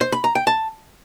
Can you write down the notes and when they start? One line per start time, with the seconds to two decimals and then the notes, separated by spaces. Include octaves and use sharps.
0.01 C5
0.12 B5
0.24 A#5
0.35 G5
0.47 A5